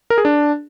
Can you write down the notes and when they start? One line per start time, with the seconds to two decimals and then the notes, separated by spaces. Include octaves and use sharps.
0.10 A#4
0.18 G#4
0.25 D4